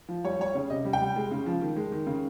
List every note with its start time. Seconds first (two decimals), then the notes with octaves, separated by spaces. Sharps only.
0.09 F3
0.24 G3 C#5
0.39 G3 C#5
0.55 C#3
0.70 C3 D#5
0.85 G3
0.93 G5
1.01 G3
1.16 G#3
1.32 C#3
1.46 F3
1.61 D#3
1.76 G#3
1.92 D#3
2.07 C#3